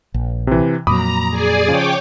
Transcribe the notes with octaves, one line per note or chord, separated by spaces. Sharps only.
A#1
C3 E3
F2 A#2 F#3 A#5 B5 D6 D#6
G#4 D5 G#5
C#3 F3 C#5 G5 D6